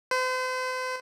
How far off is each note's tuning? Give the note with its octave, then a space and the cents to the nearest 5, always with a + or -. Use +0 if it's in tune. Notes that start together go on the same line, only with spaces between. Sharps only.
C5 -40